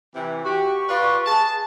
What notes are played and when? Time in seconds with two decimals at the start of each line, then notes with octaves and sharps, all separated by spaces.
0.15 C3 E3
0.44 F#4 G4 C#6
0.88 F4 B4 D5
1.26 G#4 A5